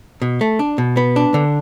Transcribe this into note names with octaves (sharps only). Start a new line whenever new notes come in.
B2
A3
D4
B2
B3
D4
D3